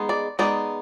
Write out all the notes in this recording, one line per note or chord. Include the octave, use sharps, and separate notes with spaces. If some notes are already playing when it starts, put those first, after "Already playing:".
Already playing: G#3 B3 D#4
D5
G#3 B3 D#4 D5